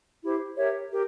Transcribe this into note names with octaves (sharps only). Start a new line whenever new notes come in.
E4 G4 C5
G4 A#4 C#5 E5
G4 A#4